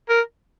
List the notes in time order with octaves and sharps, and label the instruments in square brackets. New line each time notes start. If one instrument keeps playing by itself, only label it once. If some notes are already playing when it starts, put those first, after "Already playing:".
[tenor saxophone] A#4